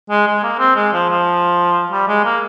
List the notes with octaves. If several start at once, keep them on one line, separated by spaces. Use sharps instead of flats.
G#3
G#3
A#3
C4
G#3
F3
F3
G3
G#3
A#3